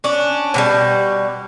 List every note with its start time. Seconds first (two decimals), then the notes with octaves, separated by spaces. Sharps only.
0.04 C#4 D4
0.54 B2 F3 G3